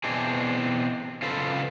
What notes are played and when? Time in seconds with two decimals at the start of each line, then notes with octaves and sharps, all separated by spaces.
0.04 B2 E3 C4 D4 G#4
1.22 C#3 F4 A4 B4 C5